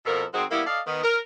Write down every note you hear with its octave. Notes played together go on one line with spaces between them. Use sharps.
F2 B2 F3 A4 A#4
D#3 G#3 C4 F#4 G#4 C5
G3 A#3 B3 E4
A4 D5 D#5 F5
D#3 B3
A#4